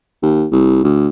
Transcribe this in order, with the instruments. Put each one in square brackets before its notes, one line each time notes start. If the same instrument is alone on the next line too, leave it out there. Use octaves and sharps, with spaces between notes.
[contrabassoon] D#2
C2
D2